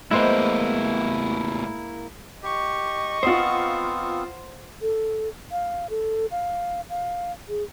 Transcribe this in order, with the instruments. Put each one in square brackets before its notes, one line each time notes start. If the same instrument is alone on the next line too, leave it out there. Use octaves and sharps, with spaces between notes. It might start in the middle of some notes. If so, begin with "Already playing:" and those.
[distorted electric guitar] A2 B3 [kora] G#3 C5 [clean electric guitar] A#3 E4
[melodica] G4 [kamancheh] D#5 C#6
[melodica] B3 C4 [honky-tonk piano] F4 D#6 [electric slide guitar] C5 F#5
[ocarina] A4
F5
A4
F5
F5
G#4